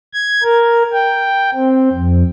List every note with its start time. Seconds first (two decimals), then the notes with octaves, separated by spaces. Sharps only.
0.13 G#6
0.43 A#4
0.93 G5
1.55 C4
1.92 F2